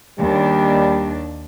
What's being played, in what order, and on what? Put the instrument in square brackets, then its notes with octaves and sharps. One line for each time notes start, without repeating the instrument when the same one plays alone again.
[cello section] D#2 D4 [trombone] G3